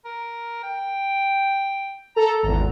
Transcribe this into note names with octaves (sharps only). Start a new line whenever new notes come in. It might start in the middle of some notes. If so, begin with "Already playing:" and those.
A#4
G5
A4 A#5
G#1 E2 A#5